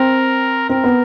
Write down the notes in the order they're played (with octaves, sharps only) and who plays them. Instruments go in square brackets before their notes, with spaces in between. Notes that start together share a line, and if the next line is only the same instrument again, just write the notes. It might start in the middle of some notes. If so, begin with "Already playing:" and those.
Already playing: [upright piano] C4 [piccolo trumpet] A#4
[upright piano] C4 [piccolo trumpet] A#4
[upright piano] B3